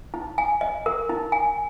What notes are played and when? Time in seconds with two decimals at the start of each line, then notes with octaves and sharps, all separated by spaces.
0.14 D#4
0.38 G#5
0.61 D#5
0.86 A#4
1.09 D#4
1.32 G#5